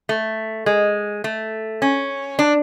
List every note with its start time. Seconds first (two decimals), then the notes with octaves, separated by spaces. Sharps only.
0.09 A3
0.66 G#3
1.24 A3
1.82 C#4
2.39 D4